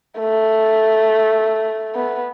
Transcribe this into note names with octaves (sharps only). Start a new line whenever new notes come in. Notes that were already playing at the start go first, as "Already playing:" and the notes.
A3
B3